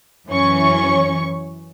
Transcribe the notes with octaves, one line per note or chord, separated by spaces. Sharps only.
F#2 E3 C#4 C#6